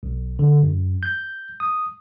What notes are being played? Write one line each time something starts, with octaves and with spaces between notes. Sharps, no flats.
B1
D3
F#2
G6
D#6